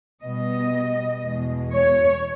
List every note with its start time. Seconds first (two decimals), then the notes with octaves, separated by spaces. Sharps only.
0.22 B2 G3 B3 D#5
1.22 E2 B2 G#3
1.73 C#5